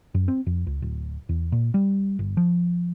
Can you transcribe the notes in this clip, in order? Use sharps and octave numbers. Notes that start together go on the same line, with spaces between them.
F#2
C4
F2
C#2
D1
E2
A#2
G3
G1
F3